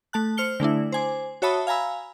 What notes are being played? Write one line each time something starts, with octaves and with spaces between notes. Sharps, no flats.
A3 A5 F#6
C5 F6 C#7 G7
D3 A3 D4 E4
C5 G#5 D6
F#4 C#5 E5 A5 B5 D#6
F5 G#5 A#5 B5 E6